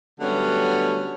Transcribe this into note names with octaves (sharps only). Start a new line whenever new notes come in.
D3 F#3 G3 A3 B3 C#4